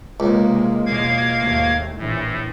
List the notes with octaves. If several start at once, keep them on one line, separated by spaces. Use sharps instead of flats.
C#2 C3 G#3 A#3
E2 B2 G#3 A#3 F5 G#6
D#2 G#2 A3
A#1 A2 E3